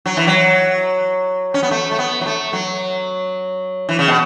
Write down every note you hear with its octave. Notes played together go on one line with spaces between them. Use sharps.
F#3
E3
F#3
C#4
B3
A3
A3
B3
F#3
A3
F#3
E3
C#3
B2